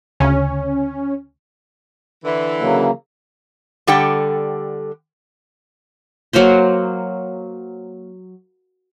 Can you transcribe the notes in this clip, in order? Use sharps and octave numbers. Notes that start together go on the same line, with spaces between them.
D2 C#3 C#4
D3 E3
C#3 F#3 A#3
D3 G3 G4 A4 F#5 G5
F#3 A#3 C5 C6